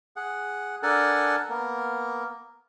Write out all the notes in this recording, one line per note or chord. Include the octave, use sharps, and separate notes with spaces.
G#4 F#5
D4 A4 A#4 F#5 G#5 A5
A#3 B3 A#4